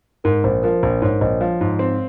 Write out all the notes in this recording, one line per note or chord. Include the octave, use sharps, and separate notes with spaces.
G#2 A#4
A#1 C5
F3 A#4
A#1 C5
G#2 C#5
A#1 C5 D#5
F3 C#5 F5
G#2
C4